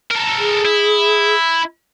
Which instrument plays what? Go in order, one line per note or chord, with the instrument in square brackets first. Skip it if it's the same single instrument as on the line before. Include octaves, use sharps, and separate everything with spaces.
[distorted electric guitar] A4 A#4
[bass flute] G#4
[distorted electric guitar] E4